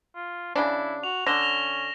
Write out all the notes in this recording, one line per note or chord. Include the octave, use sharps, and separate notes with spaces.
F4
C#3 D4 E4
F#4 F7
D3 C#4 A#6 E7 G7
F7